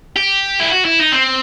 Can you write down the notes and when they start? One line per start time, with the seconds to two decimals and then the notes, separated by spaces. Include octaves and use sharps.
0.16 G4
0.60 E4
0.71 F#4
0.85 E4
0.99 D#4
1.12 C4